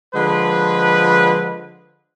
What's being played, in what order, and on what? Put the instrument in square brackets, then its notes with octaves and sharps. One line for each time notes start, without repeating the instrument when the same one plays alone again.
[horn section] D3 F3 G#3 B4